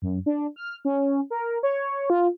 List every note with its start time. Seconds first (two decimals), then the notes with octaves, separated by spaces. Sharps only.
0.02 F#2
0.26 D4
0.56 F6
0.85 C#4
1.30 A#4
1.63 C#5
2.10 F4